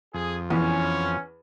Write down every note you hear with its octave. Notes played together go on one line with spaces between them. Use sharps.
F2 G#4
E2 C#4